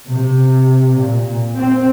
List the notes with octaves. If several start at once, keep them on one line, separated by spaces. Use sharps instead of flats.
C3
A#2
C4